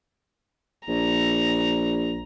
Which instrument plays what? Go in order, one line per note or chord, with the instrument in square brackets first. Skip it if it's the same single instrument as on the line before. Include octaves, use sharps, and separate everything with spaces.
[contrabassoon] A#1 [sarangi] A#5